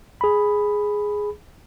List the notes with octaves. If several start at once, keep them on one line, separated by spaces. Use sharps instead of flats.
G#4 B5